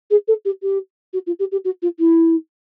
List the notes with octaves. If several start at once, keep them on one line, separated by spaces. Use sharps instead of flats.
G#4
A4
G4
G4
F#4
F4
G4
G4
F#4
F4
E4